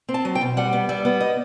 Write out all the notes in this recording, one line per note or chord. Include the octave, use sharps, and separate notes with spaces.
C4
A5
F#3
G5
B2
G3 F#5
B3
G3 E5
B3
D#5